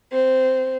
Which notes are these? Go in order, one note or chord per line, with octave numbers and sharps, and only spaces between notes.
C4